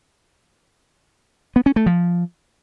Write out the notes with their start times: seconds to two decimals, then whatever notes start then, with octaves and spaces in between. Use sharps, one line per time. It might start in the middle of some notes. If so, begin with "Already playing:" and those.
1.56 B3
1.66 C#4
1.76 A3
1.86 F3